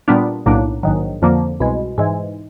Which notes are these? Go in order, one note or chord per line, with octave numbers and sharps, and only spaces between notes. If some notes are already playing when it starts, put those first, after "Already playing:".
A#2 G3 B3 D4 F4
B1 A2 F#3 A#3 D4
A#1 G#2 D#3 F#3
F2 D3 F3 A#3
C2 B2 G#3
G#2 E3 G#3